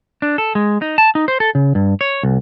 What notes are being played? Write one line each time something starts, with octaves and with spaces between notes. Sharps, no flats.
D4
A4
G#3
D#4
A5
D#4
C5
A4
C#3
G2
C#5
C2